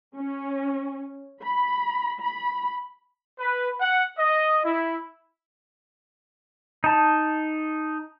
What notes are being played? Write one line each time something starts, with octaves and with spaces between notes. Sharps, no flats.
C#4
B5
B5
B4
F#5
D#5
E4
D#4 A5